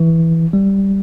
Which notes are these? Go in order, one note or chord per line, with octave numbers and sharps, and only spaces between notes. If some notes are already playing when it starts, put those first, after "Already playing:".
Already playing: E3
G3